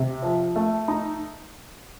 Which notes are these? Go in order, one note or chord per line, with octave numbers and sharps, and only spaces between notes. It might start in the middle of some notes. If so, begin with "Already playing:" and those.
Already playing: C3
F3
A3
D#4